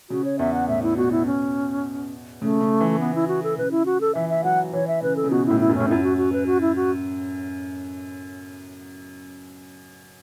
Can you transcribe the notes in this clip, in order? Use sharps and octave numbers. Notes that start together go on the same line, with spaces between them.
C#3 F#4
C#5
E2 E5
F#5
A2 E5
E4
B2 F#4
E4
C#4
C#3 A3
C#3
E3
B3
E4
F#4
A4
C#3 B4
E4
F#4
A4
E3 E5
E5
F#3 F#5
E3 C#5
E5
C#3 B4
A4
C#3
B2 F#4
A2 E4
E4
F#2
C#4
A2
F#2 E4
F#4
F#4
B4
F#4
E4
F#4